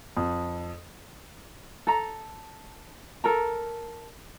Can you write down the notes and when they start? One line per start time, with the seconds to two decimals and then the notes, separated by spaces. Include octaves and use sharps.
0.17 F2
1.87 A4 A#5
3.24 A4 A#4 A#5